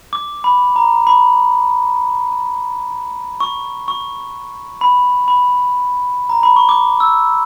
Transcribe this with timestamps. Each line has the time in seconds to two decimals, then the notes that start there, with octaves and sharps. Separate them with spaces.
0.13 D6
0.44 B5
0.76 A#5
1.07 B5
3.40 C#6
3.88 C#6
4.81 B5
5.28 B5
6.30 A#5
6.43 B5
6.56 C#6
6.69 D6
7.00 E6